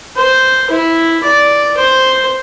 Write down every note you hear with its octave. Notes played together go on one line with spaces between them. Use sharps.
C5
E4
D5
C5